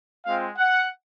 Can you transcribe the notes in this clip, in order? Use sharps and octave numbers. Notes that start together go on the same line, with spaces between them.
G#3 C4 F4 F5
F#5